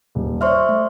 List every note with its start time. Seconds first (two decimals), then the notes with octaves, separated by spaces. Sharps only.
0.15 D#1
0.41 C5 D5 E5 C6 C#6 F6
0.69 A3